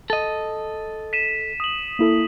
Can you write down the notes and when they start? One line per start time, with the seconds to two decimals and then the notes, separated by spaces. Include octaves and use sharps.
0.10 A4 D#5
1.13 B6 D#7 E7
1.60 D#6 F#7
1.99 A#3 E4 A4